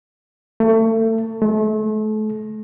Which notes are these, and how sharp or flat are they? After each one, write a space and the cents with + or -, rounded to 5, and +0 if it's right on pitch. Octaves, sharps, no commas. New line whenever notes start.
A3 +30
A3 -35